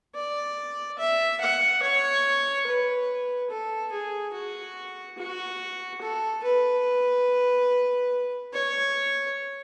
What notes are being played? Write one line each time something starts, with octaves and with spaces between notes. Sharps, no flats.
D5
E5
F#5
C#5
B4
A4
G#4
F#4
F#4
A4
B4
C#5